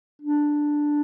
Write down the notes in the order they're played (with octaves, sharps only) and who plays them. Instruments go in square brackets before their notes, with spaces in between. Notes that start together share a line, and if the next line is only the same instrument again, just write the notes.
[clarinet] D4